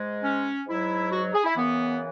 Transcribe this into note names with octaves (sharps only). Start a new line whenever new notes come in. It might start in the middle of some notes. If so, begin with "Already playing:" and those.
Already playing: G#2 G#3
C#4
G#2 F#3 E4
F#4
G#4
E4
F#2 C#3 E3 B3